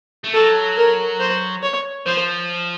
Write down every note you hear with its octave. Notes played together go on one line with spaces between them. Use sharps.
A3
F#3 A4
A#4
C5
C#5
F3 C5